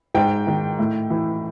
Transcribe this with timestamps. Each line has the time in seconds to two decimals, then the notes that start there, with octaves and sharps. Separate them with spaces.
0.15 G#2 G5
0.47 D#3
0.79 A2
1.10 E3